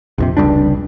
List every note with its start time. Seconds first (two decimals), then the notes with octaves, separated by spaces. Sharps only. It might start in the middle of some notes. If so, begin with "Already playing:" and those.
0.18 A#1 F2 C3
0.37 F1 C#2 G3 D4